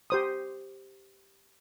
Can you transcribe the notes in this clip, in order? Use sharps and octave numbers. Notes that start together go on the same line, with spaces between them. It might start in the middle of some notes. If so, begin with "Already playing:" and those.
G4 C5 D#6